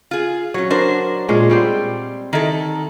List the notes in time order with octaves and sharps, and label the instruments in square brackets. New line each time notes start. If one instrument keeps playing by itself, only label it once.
[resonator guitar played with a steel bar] F4 G#4
[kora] F#3 [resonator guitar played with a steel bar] C#4 C#5
[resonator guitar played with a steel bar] D4 A#4 C5
[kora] A#2 G#3 C#4
G3 C4 G4
[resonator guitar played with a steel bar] D#3 E4 A4